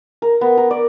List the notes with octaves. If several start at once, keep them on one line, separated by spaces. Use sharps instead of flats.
A#4
B3
A#4
D5